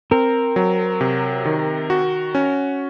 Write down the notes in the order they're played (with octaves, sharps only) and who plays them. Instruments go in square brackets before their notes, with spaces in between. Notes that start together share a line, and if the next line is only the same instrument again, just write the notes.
[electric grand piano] C4 [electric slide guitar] A#4
[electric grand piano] F#3
C3
D#3
F#4
C#4